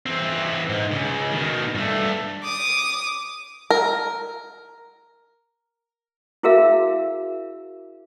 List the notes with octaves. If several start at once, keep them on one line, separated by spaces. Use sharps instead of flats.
E3 C4
G#2
C#2 C#3
B2 D#3
G2 A3
D6 D#6
A#4
E4 F#4 G#4 A#4 E5 F5